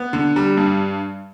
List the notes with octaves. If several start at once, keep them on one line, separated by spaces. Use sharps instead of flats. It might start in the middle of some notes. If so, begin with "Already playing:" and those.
Already playing: B3
D3
G3
G2